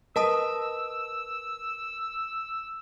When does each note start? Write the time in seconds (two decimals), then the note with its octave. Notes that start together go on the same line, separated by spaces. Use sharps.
0.16 A#4 B4 D#5 A5 D#6 E6